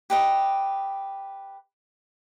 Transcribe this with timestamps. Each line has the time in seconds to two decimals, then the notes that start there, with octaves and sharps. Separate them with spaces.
0.10 G4 B4 D#5